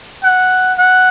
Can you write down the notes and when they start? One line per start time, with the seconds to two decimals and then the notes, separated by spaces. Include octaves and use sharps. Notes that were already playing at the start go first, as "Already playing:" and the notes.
0.23 F#5
0.79 F#5